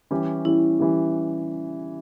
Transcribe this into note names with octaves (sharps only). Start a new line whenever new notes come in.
E3 G3 C#4 G4
E3 G3 C#4 E4 G4
E3 G3 C#4 G4